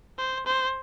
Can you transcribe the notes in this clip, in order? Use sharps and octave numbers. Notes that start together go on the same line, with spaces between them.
C5
C5